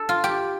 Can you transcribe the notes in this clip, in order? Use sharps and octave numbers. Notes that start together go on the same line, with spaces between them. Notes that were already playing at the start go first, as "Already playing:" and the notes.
Already playing: A4
F4
G4